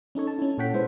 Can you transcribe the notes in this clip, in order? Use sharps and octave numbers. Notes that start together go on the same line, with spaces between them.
C#4 D#4 A4 C#5
A5
C#4 E4
A#2 A4 C#5 F#5 G5 B6
G#3 E4 A4 B4 C5 E5